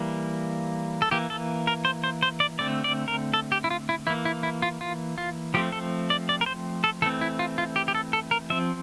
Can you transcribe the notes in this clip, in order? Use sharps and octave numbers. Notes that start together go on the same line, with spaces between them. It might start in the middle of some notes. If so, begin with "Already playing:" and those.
Already playing: E3 G3 A#3
A4
E3 A#3 G4
A4
A#4
C5
C5
C5
D5
D3 A3 C4 D5
D5
A#4
A4
G4
E4
F4
E4
E3 A#3 E4
E4
E4
F4
F4
F4
F3 A3 C4 G4
A4
D5
D5
A#4
C5
A4
E3 A3 C4 A4
E4
F4
F4
G4
G4
A4
A4
A#4
F3 C4 E5